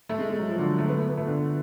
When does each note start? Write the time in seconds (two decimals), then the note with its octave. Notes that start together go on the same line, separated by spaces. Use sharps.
0.09 A3
0.19 G#3
0.29 G#3
0.39 F#3
0.49 F3
0.59 D3
0.69 F#3
0.78 A3
0.88 B3
0.98 A3
1.08 B3
1.17 A3
1.27 D3